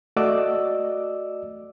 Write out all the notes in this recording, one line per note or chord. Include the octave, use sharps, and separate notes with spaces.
A3 F#4 D5 D#5 D6 E6